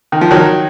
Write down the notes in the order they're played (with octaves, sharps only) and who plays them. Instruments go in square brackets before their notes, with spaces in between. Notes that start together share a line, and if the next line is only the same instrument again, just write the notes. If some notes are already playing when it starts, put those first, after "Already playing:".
[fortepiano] D#3
F3
D#3 F#3